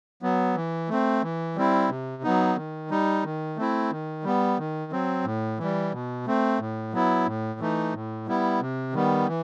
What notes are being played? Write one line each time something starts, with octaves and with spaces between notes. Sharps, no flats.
F#3 B3
E3
A3 C4
E3
G3 C4 E4
C3
F#3 B3 D#4
D#3
G3 D#4
D#3
A3 C4 E4
D#3
G3 B3
D#3
F#3 C4
A2
E3 G3
B2
A3 C4
A2
F#3 B3 E4
A2
E3 A3 D#4
A2
G3 B3 E4
C3
D#3 G3 B3
E3